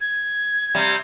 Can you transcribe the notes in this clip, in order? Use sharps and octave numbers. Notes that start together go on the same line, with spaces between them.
G#6
C3 G3